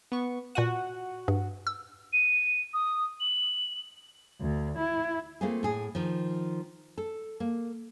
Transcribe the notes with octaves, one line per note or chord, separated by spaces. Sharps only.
B3 C#6
A#2 F#4 F#5 D#7
G2
E6
D#7
D#6
F#7
D2
E4
A3 A#3 C4 F4 G#4
A2 G#4
D#3 F3
A4
A#3